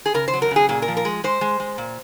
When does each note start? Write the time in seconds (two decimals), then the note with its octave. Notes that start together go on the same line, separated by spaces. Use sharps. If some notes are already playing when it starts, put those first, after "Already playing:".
0.06 G#4
0.14 C#3 A#4
0.28 C5
0.33 F#3
0.42 A#4
0.51 C#3
0.56 G#4
0.69 A#2 G#4
0.82 A#4
0.88 F3
0.97 A#4
1.05 G#3
1.24 G#3 C5
1.41 G#3
1.60 G#3
1.78 A#2